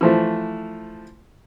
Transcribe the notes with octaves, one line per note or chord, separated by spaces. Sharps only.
E3 F3 A3